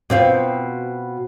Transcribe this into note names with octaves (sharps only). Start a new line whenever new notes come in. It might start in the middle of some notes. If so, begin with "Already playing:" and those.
B2 C4 F4